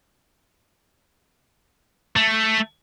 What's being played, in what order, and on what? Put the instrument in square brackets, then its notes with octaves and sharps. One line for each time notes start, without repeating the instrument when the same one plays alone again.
[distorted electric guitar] A3